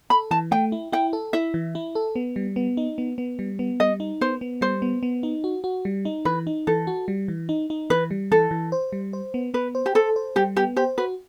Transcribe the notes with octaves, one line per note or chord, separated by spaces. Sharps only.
A4 B5
E3 A5
A3 G5
E4
E4 G5
A4
E4 E5
E3
E4
A4
B3
G3
B3
D#4
B3
B3
G3
B3
G3 D#5
D#4
B3 C5
B3
G3 C5
B3
B3
D#4
F#4
F#4
G3
D#4
E3 B4
D#4
E3 A4
F#4
G3
E3
D#4
D#4
E3 B4
G3
E3 A4
E3
C5
G3
C5
B3
B3 B4
C5
G4
A4 C5
C5
G3 G4
B3 G4
G4 C5
F#4 B4